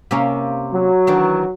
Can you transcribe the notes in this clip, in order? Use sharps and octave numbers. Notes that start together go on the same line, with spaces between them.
C3 A#3 C#4
F#3
D#3 E3 D4